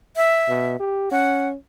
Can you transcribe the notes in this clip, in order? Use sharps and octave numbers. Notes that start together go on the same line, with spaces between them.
E5
B2
G4
C#4 F#5